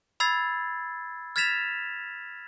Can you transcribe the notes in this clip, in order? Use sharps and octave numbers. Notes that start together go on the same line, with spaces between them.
B5 E6 G#6 A6 C7
F6 G#6 A6 B6 E7 F7